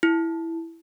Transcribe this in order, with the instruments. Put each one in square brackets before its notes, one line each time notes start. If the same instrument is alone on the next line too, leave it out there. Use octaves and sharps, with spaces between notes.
[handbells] E4